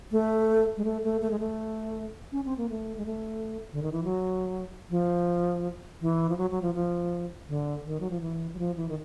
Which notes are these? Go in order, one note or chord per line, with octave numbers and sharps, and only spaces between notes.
A3
G#3
A3
A3
A3
G#3
A3
C#4
C4
A#3
A3
G#3
A3
D3
D#3
E3
F#3
F3
E3
F3
F#3
F#3
F3
F3
D3
D#3
F#3
F3
E3
F#3
F3
E3
D#3